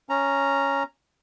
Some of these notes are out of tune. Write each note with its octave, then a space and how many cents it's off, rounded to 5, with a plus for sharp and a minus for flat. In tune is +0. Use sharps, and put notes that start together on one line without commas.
C#4 +0 A#5 +0